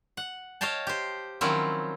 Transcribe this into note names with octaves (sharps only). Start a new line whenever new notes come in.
F#5
C#5 D#5 F5 G5 A5
G4 C5
D#3 F3 F#3 C4 C#4 E4